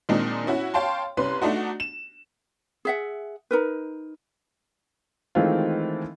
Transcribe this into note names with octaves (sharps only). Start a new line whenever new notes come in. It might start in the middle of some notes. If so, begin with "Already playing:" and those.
A#2 D#3 G#3 C4 D4 D#4
C#4 E4 F#4
C#5 F5 G5 A5 C6
C2 C#4 B4 C6
A3 D4 D#4 F#4
E7
G#4 E5 F#5
D#4 A#4 B4
D#3 E3 G#3 A3 C4 F4